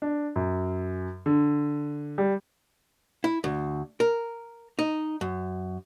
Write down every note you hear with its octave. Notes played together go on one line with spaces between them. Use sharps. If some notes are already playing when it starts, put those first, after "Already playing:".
D4
F#2
D3
G3
E4
D2
A#4
D#4
F#2